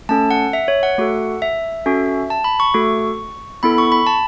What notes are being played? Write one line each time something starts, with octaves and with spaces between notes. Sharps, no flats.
A3 C#4 A4 A5
F#5
E5
C#5
F#5
A3 F#4 A4
E5
C#4 F#4 A4
A5
B5
C#6
A3 F#4 A4
B3 E4 A4 B5
C#6
B5
A5